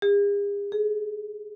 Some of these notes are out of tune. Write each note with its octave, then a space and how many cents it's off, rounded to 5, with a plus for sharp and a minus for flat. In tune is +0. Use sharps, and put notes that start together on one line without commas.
G#4 -45
G#4 +30